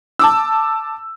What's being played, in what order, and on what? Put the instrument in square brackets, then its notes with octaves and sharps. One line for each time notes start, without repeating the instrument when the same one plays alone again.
[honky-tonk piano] A5 D6 E6